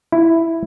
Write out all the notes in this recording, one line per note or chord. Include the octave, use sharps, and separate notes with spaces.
E4